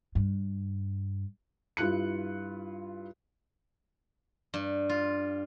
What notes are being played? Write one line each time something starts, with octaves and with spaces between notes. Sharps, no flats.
G2
G2 E4 F4 F#6 C#7
G2
F4